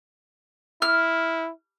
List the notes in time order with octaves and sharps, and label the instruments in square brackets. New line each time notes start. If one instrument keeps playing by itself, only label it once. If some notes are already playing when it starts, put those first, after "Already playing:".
[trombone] E4 [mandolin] F6